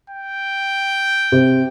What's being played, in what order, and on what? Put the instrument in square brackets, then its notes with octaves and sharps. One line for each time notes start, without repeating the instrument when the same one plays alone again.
[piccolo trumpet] G5
[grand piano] C3